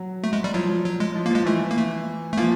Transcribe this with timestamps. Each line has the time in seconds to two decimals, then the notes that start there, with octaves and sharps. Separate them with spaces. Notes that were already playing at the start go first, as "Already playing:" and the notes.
Already playing: F#3
0.24 A3
0.33 G#3
0.44 G3
0.54 F3 F#3
0.84 F#3
1.00 G#3
1.15 F3
1.26 A#3
1.30 F3 G#3
1.46 E3 A3
1.71 A#3
1.77 A3
2.33 A3
2.37 F3 A#3